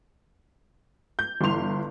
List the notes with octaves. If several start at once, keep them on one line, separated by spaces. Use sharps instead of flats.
G6
G1 G2 E3 C6 F7